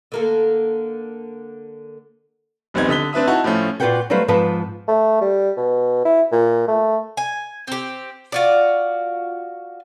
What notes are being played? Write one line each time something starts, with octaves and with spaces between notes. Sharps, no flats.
D3 A#3 A4
D#1 A#1 B3 C4 D#4 G#6
D3 D#6 B6 G7
C4 D4 B4 E5 D#6
D#4 E4 F#4 A5
A2 F3 A3 C#4
A#2 F4 F#4 B4 F#5 G5
F#3 G3 A3 B4 C5 F5
G#2 F3 B3 F4 B4 A5
A3
G3
B2
E4
A#2
A3
G#5
C4 G4
F4 F#4 D5